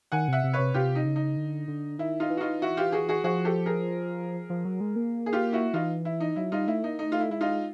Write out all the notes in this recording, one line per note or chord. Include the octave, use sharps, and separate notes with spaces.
D#3 F#5 G#5
C3 E5 F#5
C3
B4 C#5
C3
C3 F4 G4
D#4
C#3
D#4
D3
D3
D#3 E4
D#4 F4
E3
F#4
D#4 F4
E4 F#4
F4 G4
F#4 G#4
F#4 G#4
F3 F#4 G#4
G4 A4
G#4 A#4
F3
F#3
G#3
A#3
G#4
F4 G4
E4 F#4
E3 D#4 F4
E4
D#4
F#3 E4
G3 D#4 F4
A3 E4
A#3 D#4
A3 D#4
F4
E4
G#3 E4
D#4 F4